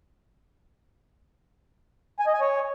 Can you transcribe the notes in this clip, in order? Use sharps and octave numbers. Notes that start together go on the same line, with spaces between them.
G#5
D#5
G#5
C#5